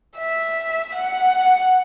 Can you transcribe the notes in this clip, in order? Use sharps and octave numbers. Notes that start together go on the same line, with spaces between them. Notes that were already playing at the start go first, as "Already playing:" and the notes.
E5
F#5